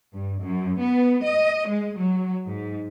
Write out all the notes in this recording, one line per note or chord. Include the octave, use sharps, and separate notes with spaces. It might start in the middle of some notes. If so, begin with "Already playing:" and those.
G2
F#2
B3
D#5
G#3
F#3
G#2